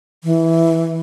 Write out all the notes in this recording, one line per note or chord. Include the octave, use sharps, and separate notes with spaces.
E3